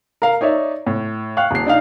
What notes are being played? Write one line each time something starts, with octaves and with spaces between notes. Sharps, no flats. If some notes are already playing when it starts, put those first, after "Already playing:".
A#4 F5
D#4 C#5 D5 E5
A2
F5 G5 C#6 F#6
D#1 C7
D4 D#4 F5